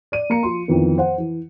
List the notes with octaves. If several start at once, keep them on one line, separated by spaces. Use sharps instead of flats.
D5 D#7
A#3 A#5 C#7
F3 C6
F2 D#3 E3 B3
C5 F#5
E3